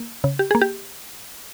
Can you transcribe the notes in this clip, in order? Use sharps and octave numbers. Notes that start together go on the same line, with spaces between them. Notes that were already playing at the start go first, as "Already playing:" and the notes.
Already playing: A#3
C#3
G4
A#3 G#4
G4